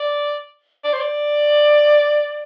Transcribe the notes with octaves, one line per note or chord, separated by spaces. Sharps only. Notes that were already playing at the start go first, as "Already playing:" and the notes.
Already playing: D5
D5
C5
D5